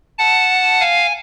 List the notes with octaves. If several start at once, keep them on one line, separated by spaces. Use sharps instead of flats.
F#5 A5
F5 G#5